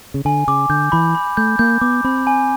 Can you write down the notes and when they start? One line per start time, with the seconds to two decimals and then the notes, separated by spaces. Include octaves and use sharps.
0.14 C#3
0.25 D3 G#5
0.48 C#3 D6
0.70 D3 G6
0.92 E3 B5
1.15 B5
1.37 A3 G6
1.59 A#3 G6
1.81 B3 D6
2.04 C4 B5
2.27 G#5